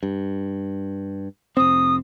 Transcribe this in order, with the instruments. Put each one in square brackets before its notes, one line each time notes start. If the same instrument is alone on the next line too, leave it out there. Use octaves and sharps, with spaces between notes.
[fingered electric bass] G2
[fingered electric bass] F1 C4 [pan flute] D#6